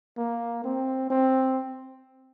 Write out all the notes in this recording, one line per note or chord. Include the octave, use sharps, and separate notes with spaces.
A#3
C4
C4